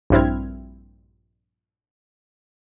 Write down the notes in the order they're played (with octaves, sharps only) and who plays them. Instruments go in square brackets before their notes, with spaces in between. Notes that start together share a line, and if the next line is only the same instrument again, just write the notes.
[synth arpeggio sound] A#1 G2 C4 E4 F6 G#6